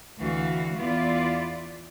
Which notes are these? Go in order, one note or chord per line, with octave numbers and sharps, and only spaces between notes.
D2 E3 F#4 F5
E2 B3 E4 F4 D5